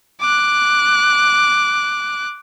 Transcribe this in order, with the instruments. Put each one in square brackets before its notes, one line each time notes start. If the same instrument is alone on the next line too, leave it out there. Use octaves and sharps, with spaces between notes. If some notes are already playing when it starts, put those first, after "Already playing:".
[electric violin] D6 F#6